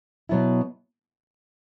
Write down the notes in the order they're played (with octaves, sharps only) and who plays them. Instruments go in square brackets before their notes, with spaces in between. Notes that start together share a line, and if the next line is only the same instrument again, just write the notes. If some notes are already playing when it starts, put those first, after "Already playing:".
[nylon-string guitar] B2 F#3 B3 E4